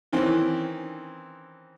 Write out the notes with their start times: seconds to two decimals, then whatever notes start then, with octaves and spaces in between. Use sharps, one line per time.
0.13 D#3 E3 C4 C#4